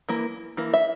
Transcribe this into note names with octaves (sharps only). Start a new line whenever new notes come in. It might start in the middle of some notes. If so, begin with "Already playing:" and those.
E3 A#3
E3 A#3
E5